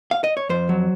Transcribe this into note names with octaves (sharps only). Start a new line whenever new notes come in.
F5
D#5
C#5
F2 C5
F#3